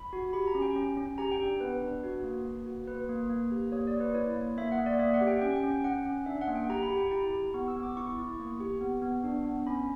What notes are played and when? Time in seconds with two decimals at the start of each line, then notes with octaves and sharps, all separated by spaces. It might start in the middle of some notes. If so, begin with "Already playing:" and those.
Already playing: B5
0.13 F#4
0.33 G4 B5
0.47 A#5
0.55 C#4
0.62 G5
0.76 C#4
0.97 C#4
1.18 G4 A#5
1.32 G5
1.39 D4
1.60 B3 B4
1.82 D4
2.03 F#4
2.24 A#3
2.45 A#3
2.66 F#4
2.87 A#3 B4
3.09 A#3
3.29 A#3
3.51 G4
3.72 A#3 C#5
3.87 D5
3.94 A#3
4.00 B4
4.14 E4 C#5
4.36 A#3
4.58 A#3 E5
4.72 F#5
4.78 A#3
4.86 D5
4.99 A#3 E5
5.14 F#5
5.21 G4
5.28 G5
5.42 C#4 G5
5.56 G5
5.63 C#4
5.71 G5
5.84 C#4 F#5
6.06 C#4
6.26 D4 E5
6.41 F#5
6.47 A#3
6.55 G5
6.70 G4 A#5
6.83 B5
6.90 G4
6.98 G5
7.11 E4 A#5
7.33 G4
7.54 B3 C#6
7.68 E6
7.76 B3
7.83 D6
7.96 E4 C#6
8.18 E4
8.39 A#3
8.60 G4
8.81 B3
9.02 B3
9.24 D4
9.45 B3
9.67 C#4 B5